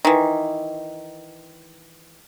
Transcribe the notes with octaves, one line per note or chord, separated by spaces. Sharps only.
D#3 E3